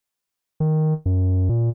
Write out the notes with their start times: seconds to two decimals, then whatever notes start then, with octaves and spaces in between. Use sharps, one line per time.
0.60 D#3
1.06 F#2
1.49 A#2